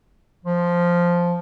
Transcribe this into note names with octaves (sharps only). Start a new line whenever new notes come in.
F3